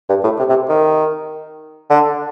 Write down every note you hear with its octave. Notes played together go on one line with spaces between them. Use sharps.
G2
A2
C3
C3
D#3
D3